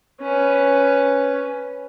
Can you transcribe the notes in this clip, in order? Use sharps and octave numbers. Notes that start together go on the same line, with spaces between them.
C#4 B4